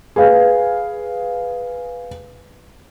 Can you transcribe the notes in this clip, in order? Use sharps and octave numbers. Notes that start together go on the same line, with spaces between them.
G#4 B4 F5